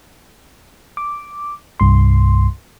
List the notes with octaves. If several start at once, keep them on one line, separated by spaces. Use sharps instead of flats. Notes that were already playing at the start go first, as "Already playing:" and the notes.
D6
C2 G2 C6